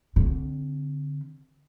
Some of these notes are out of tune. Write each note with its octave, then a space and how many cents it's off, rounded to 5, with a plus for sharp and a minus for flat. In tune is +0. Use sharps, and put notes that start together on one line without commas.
D3 -20 C4 +0